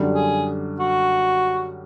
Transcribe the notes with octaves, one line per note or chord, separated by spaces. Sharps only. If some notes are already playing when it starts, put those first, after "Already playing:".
Already playing: F#2 D3 G3
G#4
F#4